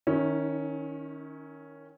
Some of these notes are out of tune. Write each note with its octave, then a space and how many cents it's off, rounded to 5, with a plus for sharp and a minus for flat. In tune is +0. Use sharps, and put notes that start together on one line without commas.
D#3 +0 C#4 +0 E4 -45